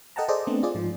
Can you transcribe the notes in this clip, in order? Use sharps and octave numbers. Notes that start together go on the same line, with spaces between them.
A4 D#5 F#5 G5 A5 A#5
G#4 A4 C5 D5 D#5
A3 B3 C4 D4
F4 G#4 D5
G#2 F3